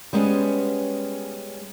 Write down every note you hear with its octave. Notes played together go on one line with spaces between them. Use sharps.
G3 G#3 B3 C#4